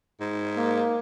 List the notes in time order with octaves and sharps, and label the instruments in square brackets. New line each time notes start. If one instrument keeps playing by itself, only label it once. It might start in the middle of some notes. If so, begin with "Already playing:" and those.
[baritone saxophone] G#2
[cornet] A#3